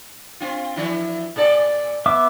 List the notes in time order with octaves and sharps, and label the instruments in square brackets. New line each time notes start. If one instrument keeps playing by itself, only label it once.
[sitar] C4 F4
E3 F3 E4
A#2 A4 D5
[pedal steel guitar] B3 E5 D6